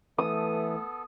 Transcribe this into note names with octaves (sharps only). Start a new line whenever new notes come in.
E3 A3 B3 A4 D#6